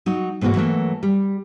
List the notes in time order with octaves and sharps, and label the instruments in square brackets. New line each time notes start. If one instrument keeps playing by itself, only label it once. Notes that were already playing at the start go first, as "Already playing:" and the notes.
[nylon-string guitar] F#3 D#4
G#2 B2 E3 A#3 F#4
E3 F#3 A3 A#3
G3